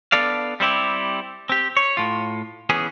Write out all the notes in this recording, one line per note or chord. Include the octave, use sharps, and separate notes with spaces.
B3 D4 A4 D5 F5
G3 C4 E4 G4
C4 G4
C#5
A2 F4
E3 B3 C#4 G#4